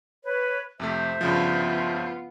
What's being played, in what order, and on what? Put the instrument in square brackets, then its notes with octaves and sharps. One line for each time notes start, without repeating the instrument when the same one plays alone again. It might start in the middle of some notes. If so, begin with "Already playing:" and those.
[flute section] B4 C#5
[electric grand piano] F2 C3 A3 [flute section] C5 E5
[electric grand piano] G2 C#3 F3 [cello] B3 F4